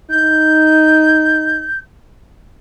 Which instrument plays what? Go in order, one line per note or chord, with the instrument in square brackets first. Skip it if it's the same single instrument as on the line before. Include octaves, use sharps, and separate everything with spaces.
[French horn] D#4 [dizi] G6